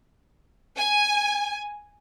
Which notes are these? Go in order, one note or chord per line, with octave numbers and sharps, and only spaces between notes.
G#5